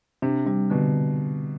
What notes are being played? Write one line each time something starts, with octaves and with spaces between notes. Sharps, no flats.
C3 D4
C3 G3
B2 D3